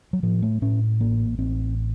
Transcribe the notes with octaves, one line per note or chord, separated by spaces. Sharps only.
F#3
A2 F3
A3
A2 C#4
A1 A#3
A1 C4